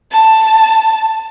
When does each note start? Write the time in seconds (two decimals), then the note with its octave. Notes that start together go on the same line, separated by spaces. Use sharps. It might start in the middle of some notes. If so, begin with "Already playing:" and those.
0.12 A5